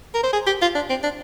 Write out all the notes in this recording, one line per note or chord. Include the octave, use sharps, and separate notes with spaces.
A#4
C5
G#4
G4
F4
D4
C4
D4